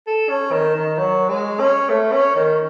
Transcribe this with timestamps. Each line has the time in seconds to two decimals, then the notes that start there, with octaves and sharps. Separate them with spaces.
0.07 A4
0.29 C#4
0.52 D#3
0.75 D#3
0.98 F#3
1.29 G#3
1.59 C#4
1.89 A3
2.11 C#4
2.35 D#3